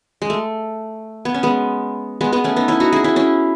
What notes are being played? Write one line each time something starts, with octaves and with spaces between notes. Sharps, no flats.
G#3
A3
B3
C#4
G#3 B3
G#3 B3
G#3 B3
A3 C#4
B3 D#4
C#4 E4
D#4 F#4
E4 G#4
C#4 E4
C#4 E4